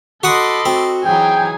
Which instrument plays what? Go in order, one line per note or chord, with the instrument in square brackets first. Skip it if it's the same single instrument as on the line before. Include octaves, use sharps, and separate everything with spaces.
[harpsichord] F#4 F#5 D#6 [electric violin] A4 D#5 [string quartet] B5 C6 D6
[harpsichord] C4 [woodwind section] F#4
[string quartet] E3 F#3 D#4 [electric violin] G#4 G#5 [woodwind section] G5